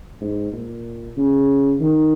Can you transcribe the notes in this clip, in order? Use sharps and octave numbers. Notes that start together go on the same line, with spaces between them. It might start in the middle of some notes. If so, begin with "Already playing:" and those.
G#2
A#2
C#3
D#3